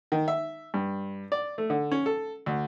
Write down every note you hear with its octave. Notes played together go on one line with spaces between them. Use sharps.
D#3
E5
G2
D5
A3
D3
C#4
A4
D2